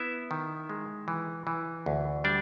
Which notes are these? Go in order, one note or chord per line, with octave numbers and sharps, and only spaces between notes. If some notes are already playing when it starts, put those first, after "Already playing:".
Already playing: B3 E4 E5
D#3
G#3
E3
E3
D2
G3 D4 D5